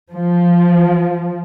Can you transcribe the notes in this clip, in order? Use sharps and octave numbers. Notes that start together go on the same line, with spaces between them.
F3